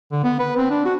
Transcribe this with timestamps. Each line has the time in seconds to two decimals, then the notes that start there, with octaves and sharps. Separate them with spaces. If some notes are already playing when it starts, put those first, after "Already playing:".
0.12 D3
0.24 B3
0.39 B4
0.57 C4
0.70 D4
0.85 F#4